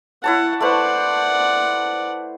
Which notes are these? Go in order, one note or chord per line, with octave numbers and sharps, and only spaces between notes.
E4 C#5 F#5 A5
A3 B4 C5 D5 F#5